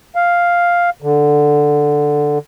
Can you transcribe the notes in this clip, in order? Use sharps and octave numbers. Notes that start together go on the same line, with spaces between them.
F5
D3